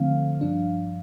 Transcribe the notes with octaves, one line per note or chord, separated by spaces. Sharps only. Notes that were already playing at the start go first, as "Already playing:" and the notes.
Already playing: D3 F3 A3 C4 F5
G2 F3 D4